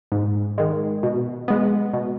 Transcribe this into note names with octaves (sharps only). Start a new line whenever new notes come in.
G#2
D#3 G#3
B2
G#3 B3
B2